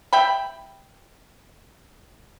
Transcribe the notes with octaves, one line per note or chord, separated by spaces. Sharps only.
E5 G5 B5